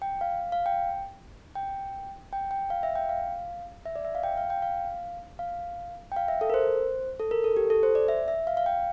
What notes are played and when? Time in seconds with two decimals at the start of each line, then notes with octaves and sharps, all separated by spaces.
0.02 G5
0.21 F5
0.52 F5
0.66 G5
1.55 G5
2.33 G5
2.51 G5
2.70 F5
2.83 E5
2.96 G5
3.09 F5
3.86 E5
3.96 D5
4.05 E5
4.15 F5
4.23 G5
4.37 F5
4.50 G5
4.62 F5
5.39 F5
6.12 G5
6.16 F5
6.28 E5
6.41 A4
6.50 A#4
6.54 C5
7.20 A4
7.31 A#4
7.44 A4
7.57 G4
7.70 A4
7.83 C5
7.95 D5
8.08 E5
8.28 E5
8.47 F5
8.57 F5
8.66 G5